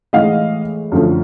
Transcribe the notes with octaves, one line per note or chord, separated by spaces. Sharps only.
A2 E3 G#3 D#5 F5
F#2 D3 F3 A3